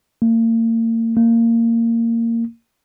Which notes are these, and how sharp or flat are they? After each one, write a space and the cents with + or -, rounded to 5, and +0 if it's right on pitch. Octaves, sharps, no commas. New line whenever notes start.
A#3 -40
A#3 -20